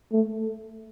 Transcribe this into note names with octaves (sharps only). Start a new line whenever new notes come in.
A3